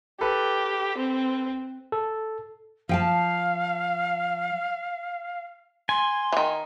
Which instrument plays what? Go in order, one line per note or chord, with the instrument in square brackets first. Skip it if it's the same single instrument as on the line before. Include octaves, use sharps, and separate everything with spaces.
[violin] G4 [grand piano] A4 B4
[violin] C4
[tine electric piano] A4
[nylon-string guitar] F3 G5 A5 [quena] F5
[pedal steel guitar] G#5 [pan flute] C6
[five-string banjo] D#3 E3